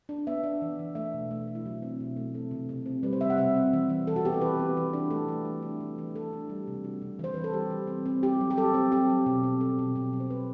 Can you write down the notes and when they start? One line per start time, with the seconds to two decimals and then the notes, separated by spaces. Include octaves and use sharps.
0.09 D4
0.27 B3 E5
0.43 D4
0.62 E3
0.79 E3
0.95 A3 E5
1.14 B2
1.31 A3
1.47 A3
1.55 E4
1.65 F#3 F#4
1.82 C4
2.00 B2
2.16 A3
2.34 C4 A4
2.51 C3
2.69 C3
2.86 C4
3.03 G3 B4
3.13 C5
3.21 C3 E5
3.30 F#5
3.38 C3 E5
3.56 C4
3.73 E3
3.89 E3
4.07 E3 A4
4.16 F#4
4.25 B3 G4
4.34 A4
4.41 E3 B4
4.59 B3
4.77 E3
4.93 D4
5.11 A3 A4
5.28 E3
5.45 A3
5.62 D4
5.80 E3
5.98 E3
6.15 E3 A4
6.33 D4
6.49 G3
6.67 C3
6.84 D4 F#4
7.01 C3
7.19 E3 C5
7.34 E3 B4
7.44 A4
7.53 G3 G4
7.70 E3
7.87 C4
8.06 C4
8.23 C4 G4
8.40 F#3
8.51 G4
8.57 F#3 A4
8.74 C4
8.92 C4 G4
9.09 F#3
9.26 B2
9.43 C4
9.60 C4 A4
9.79 B2
9.95 B2
10.13 F#3
10.20 C5
10.30 B2 B4